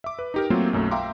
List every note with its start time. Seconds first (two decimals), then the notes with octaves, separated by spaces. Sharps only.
0.04 E5 D6
0.19 B4
0.34 D#4 G4 A#4
0.50 F#3 A3 A#3 C4 F4 A4
0.73 B1 F#2 F#3 A3
0.91 E5 F5 G5 A#5 C6 D6